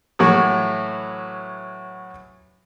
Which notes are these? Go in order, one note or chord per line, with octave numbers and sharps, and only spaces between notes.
A2 E3 F#3 F#4